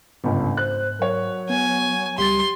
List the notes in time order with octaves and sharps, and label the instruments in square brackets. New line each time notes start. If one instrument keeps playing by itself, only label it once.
[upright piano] G1 C#2 [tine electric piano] G#2
[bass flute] C5 [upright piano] F#6
[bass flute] F#3 [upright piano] A#4 C#5
[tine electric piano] B3 [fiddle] G#5
[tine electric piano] C#2 G3 A6 [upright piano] G4 [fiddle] C6